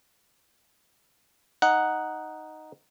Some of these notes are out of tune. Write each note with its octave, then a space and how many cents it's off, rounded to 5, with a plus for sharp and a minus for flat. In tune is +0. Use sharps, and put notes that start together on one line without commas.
D#4 +0 F#5 +0